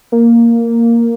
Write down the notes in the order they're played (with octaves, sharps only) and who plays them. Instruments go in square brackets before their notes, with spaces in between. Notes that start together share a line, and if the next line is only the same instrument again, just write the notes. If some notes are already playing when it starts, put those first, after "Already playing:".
[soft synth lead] A#3